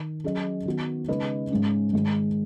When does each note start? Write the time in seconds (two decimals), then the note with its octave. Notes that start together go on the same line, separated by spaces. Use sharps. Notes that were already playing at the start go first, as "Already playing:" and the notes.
Already playing: D#3
0.24 F#3 C#4 G#4 D#5
0.65 D#3 B3 F#4
1.08 C#3 G#3 D#4 B4 D#5
1.50 G#2 G#3 C#4
1.93 G#2 D#3 G#3